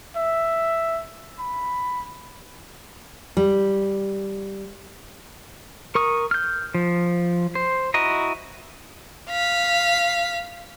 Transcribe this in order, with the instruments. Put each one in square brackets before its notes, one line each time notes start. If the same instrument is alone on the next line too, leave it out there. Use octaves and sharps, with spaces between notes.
[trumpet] E5
B5
[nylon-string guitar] G3
[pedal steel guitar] A#4 C#6 D#6
F6 G6
F3
C5
E4 F#4 D#5 A#5
[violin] F5 B6